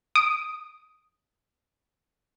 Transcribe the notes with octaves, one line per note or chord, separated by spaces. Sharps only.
D#6 D7